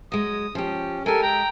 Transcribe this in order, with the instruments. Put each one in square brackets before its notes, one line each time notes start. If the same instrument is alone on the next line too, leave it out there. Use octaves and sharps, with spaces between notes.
[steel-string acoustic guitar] F#3 G#3 [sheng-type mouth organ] D#6
[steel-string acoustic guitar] F3 G4 [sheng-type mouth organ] C#4
[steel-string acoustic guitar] G#3 G4 [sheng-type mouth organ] A4 A#4 G#5
[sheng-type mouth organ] G5 A#5